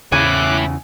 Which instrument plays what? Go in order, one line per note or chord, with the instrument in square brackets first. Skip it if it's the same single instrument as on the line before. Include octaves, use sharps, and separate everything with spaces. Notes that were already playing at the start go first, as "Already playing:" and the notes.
[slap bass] E2 C#3 [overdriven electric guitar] E4 C#5 [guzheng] G#5 [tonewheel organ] D6 F#6